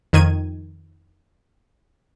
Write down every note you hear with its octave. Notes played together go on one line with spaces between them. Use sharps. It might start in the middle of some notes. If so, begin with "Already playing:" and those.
F2 D#3 G#6 D#7